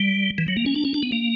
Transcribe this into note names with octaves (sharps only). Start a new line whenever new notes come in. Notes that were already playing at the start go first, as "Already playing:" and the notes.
Already playing: G3
E3
F#3
A#3
C#4
D4
C#4
D4
B3
A#3